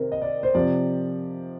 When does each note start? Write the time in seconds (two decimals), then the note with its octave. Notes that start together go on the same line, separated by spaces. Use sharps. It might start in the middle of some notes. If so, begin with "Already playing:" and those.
Already playing: C3 D#3 A#4 C5
0.12 D#5
0.22 D5
0.43 C5
0.54 C3 F3 D5